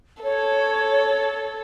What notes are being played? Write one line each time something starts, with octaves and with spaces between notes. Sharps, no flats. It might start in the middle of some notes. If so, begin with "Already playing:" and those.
A4 C#5